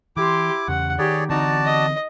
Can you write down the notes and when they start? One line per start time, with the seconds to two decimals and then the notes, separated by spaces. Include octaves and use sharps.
0.17 E3 E4 G4 C6 D6
0.68 E2 C#3 F#5
0.99 D#3 G4 G#4 C#5 D5
1.30 D3 E3 C4 D#4 F#4 D5 A5
1.65 D#5